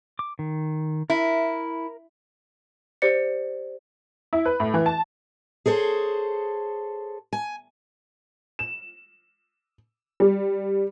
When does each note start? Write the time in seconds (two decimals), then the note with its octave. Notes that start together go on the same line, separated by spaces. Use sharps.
0.19 D6
0.39 D#3
1.10 E4 A#4
3.02 G4 C5 D5 C#7
4.33 E4
4.45 B4
4.60 A2
4.74 E3
4.86 A5
5.66 G#4 A4 C5 C#5
7.33 G#5
8.59 E7
10.20 G3